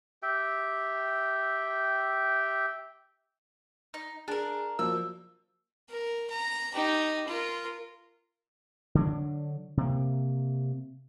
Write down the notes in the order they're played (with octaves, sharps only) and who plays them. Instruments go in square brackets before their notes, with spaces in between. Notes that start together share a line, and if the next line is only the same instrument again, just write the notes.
[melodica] G4 E5 G5
[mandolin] D#4
[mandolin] D4 A#4 [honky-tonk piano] G#4
[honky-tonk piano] F3 F#3 A#3 [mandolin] E6
[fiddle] A#4
A#5
D#4 G4
F4 A#4
[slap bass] D3 F#3 D4
C3 A#3